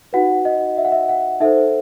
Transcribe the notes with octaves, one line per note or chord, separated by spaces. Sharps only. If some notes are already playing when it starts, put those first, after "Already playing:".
D#4 F#4 B4 F#5
D#5
E5
F#5
E5
F#5
D#4 A4 C5 E5